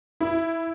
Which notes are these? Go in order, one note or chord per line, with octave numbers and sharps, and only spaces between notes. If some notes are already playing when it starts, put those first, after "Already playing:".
E4